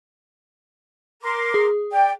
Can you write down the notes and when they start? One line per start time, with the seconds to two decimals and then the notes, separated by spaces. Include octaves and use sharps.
1.22 A#4 C6 D6
1.54 G#4
1.91 D5 G5